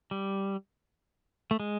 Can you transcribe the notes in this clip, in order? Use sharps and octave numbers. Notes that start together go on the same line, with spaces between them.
G3
A3
G#3